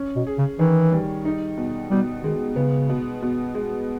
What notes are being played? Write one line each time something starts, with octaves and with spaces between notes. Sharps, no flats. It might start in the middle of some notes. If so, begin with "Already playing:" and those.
Already playing: C#4
B2
G#4
C#3
D#3 E3
G3
D#4
B2
B2 G3
D#3 G#3
C#3 B3
B2
B2
G#3